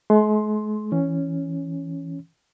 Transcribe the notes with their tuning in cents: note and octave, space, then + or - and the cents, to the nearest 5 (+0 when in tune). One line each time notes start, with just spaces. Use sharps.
G#3 +45 C6 +5
E3 +0 C#4 +0